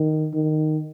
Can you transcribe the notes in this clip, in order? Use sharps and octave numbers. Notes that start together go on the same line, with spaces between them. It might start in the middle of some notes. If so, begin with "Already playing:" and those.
Already playing: D#3
D#3